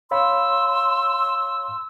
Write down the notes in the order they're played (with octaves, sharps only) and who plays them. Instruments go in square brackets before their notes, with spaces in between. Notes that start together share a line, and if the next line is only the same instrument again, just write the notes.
[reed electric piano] C#5 F5 B5 [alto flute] C6 [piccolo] E6